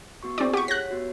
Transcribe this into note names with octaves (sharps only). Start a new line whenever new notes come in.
B3 F#4 C#6
C4 E4 G#4 D5
G4 F#5 C#6 B6
G4 C#5 F#6 A#6
B3 F#4 C#5